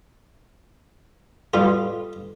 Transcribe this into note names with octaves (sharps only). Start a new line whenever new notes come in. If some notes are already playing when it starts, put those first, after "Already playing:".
G3 F4 A4 B4 F5